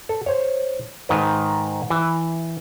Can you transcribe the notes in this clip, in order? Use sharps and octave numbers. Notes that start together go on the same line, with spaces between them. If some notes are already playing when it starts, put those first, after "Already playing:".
A4
C5 C#5
G#2 D#3 B4
E3